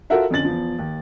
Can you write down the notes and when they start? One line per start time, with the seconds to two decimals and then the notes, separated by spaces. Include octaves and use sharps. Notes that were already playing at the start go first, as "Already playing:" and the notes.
0.10 F4 F#4 A4 A#4 E5 F#5
0.30 F2 D3 C#4 A6 F#7
0.45 E2 F3
0.79 D#2